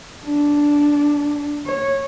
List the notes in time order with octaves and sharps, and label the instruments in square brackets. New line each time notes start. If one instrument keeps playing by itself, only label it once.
[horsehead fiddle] D4
C#5